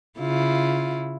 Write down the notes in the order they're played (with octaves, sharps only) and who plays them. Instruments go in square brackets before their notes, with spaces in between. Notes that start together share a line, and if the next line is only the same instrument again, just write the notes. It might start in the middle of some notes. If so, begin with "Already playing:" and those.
[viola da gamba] C#3 E4 F4